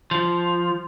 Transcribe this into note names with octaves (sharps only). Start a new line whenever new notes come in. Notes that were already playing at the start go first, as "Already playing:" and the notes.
F3